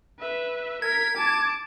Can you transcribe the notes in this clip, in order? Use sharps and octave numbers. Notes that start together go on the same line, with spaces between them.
B4 E5
A#4 G#6 B6
A5 D6